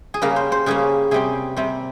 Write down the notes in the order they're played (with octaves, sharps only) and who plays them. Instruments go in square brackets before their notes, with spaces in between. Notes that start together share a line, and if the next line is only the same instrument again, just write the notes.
[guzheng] G#4
C#3 G3 A#3 A#4
C5
C5
C#3 G3 A#3 G#4
C3 G3 C4 G#4
C3 G3 C4